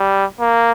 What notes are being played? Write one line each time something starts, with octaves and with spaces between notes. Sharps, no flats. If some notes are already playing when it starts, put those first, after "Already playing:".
Already playing: G3
A#3